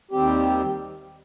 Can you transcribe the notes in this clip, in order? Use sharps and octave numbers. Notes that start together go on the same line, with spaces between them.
D#2 D#3 G3 C4 G4